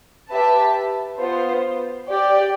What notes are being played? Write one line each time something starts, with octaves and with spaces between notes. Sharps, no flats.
G4 B4 E5 A5
B3 F4 C5
G4 D5 G5